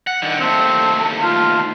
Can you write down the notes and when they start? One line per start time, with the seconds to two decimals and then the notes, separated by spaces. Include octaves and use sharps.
0.07 F#5
0.22 D3 D#3
0.40 D#2 A3 C4
1.22 F4